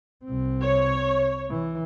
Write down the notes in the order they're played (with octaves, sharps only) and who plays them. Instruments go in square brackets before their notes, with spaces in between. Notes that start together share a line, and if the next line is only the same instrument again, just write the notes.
[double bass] C2 C4
[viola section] C#5
[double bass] E3